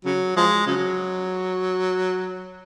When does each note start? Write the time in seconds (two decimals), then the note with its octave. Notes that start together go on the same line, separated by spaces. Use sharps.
0.05 C#3 F#3
0.36 F3 G#3
0.67 C#3 F#3